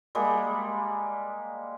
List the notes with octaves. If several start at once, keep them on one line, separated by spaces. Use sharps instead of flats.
G3 G#3 A#3